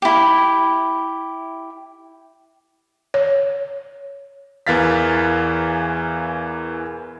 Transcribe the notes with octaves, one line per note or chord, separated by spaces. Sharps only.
E4 G4
C#5
E2 E3 A#4 F5 A6 B6